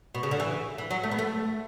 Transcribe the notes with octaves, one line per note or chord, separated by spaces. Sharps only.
B2
C#3
D3
E3
E3
F#3
A3
B3
A3